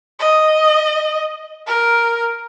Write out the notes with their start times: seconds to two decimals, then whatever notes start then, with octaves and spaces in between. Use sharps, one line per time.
0.20 D#5
1.67 A#4